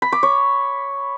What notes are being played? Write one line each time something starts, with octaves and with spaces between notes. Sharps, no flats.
B5
D6
C#5